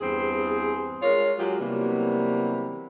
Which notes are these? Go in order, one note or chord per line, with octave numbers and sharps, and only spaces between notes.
E2 G2 C4 G#4
G#3 F4 A#4 C#5
F#3 G#3 F4 G4 G#4
C3 E3 F#3 G3 A#3 B3